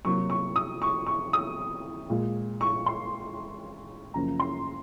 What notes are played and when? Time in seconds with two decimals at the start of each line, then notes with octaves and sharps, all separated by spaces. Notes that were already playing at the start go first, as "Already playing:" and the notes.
0.05 C3 F#3 A#3 C#6
0.30 C#6
0.56 D#6
0.82 C#6
1.07 C#6
1.33 D#6
2.10 A#2 G#3
2.61 C#6
2.86 C6
4.14 F#2 C#3 F3 A#3 A#5
4.40 C6